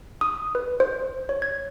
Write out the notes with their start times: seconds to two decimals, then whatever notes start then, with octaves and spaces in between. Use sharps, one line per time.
0.21 D#6
0.55 B4
0.80 C5
1.29 C#5
1.42 G#6